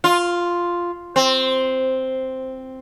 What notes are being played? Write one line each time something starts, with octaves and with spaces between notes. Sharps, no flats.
F4
C4